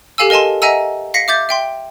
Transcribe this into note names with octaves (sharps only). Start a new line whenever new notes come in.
G4 A4 F5 G#5 E6
A#4 D#5 G#5 A5 C6
D#5 E5 F#5 G#5 A#5 E6
F5 A#6 B6 C#7
E5 D6 G6 A6
E5 G5 C6